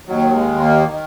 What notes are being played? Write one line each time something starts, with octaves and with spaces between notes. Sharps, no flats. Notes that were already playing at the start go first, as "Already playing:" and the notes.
D#2 D#3 F#3
G#3
A#3
D#3